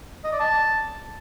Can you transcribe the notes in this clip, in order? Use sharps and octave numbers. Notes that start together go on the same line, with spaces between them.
D#5
D5
A5